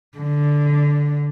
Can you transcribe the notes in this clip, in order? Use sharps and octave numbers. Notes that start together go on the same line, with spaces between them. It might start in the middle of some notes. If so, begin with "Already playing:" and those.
D3